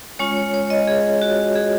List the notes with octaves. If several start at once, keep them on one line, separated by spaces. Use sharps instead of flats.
G#3 C#4 F4 C#5
C#5
C#5
D#5
G#4
F#4
G#4